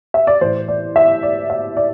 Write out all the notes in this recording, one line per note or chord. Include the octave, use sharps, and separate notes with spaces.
E5
D5
A2 E3 C5
D5
E5
D5
E5
D5